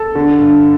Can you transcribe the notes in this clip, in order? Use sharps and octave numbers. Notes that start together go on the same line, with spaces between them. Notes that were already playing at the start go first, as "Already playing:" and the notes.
Already playing: A4
D3
G2